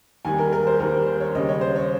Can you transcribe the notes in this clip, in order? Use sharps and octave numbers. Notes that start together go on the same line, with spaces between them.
D#2 D#3 G3 G#5
A#4
A#4
C5
D#2 D#3 G3 A#4
C5
C#5
D#2 C#3 G3 D#5
C#5
C5
C#5